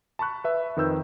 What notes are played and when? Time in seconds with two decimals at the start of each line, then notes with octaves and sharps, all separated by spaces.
0.19 A5 B5 C#6 F#6
0.44 B4 E5
0.76 F2 D#3 B4 E6 G6